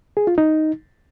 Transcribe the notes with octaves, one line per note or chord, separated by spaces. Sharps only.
G#4
F4
D#4